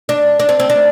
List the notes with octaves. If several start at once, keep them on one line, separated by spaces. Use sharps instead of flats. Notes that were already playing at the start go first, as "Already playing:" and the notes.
D4
D4
C4
C4
D4